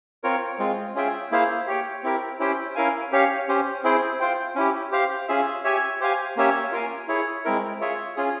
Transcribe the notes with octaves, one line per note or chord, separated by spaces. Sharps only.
C4 F4 A#4 C#5
G#3 C4 F4
C#4 F4 G#4 E5 G5
A#3 E4 G#4 C5 F5
G4 C#5 G5
C4 E4 G4 A#4
C#4 E4 G4 C5 G5
C#4 E4 A#4 F5 G#5
C#4 G4 C#5 F5
C#4 G4 C5
C4 E4 G#4 C5 G5
F4 C5 G5
C#4 E4 G4
G4 C5 F5
C#4 F4 G#4 E5
G4 C#5 E5 G#5
G4 C5 F5 G#5
A#3 C#4 G4 C#5 E5
F4 A#4 F5 G#5
E4 G#4 C#5
G#3 C4 E4 A#4
F4 G#4 C#5 E5
C#4 F4 G#4